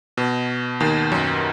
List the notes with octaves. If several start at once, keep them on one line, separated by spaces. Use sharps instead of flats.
B2
D#2 D#3
F#2 F#3